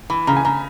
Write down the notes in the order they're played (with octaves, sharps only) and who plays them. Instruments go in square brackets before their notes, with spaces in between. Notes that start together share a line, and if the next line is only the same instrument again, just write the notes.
[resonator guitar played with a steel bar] E3 [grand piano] B5
[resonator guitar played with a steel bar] C#3 [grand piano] A#5
[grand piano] G#5
[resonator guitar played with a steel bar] C#3 [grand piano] A#5